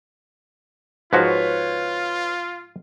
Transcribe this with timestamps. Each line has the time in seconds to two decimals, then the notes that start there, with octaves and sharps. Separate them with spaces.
1.13 G#2 F3 F4 F#4 B4 C#5